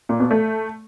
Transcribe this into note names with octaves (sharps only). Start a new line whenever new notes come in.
A#2
B2
A3